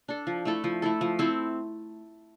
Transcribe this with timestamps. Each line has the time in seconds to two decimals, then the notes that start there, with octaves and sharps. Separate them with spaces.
0.08 D4 A4
0.27 F3
0.45 A3 E4 A4
0.64 F3
0.82 A3 E4 A4
1.01 F3
1.19 C4 E4 A4